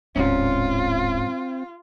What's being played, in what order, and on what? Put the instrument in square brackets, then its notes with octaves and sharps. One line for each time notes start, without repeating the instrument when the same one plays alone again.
[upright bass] D1 A1 [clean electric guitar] G#2 C#4 [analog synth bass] C4 [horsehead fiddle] F4